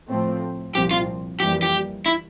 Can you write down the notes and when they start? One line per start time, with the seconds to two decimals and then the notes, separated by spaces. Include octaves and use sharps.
0.09 A2 F3 A3 C4
0.75 C2 A#2 F3 C4 G4
0.91 F4
1.40 F2 E3 G3 A#3 G4
1.62 G4
2.06 E4